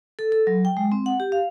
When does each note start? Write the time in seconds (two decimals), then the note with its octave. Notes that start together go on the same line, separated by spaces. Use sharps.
0.19 A4
0.32 A4
0.47 F#3
0.65 G5
0.77 G#3
0.92 C4
1.06 F#5
1.20 G4
1.32 F5